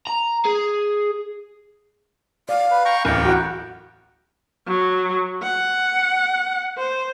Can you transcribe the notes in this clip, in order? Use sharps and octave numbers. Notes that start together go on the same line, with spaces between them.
A#5
G#4
D5 F5
B4
G5 A#5 C#6
D1 A1 A#4 G5
F#4 F#5
F#3
F#5
C5